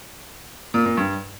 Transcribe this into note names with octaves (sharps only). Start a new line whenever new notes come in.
A#2
A#2
G2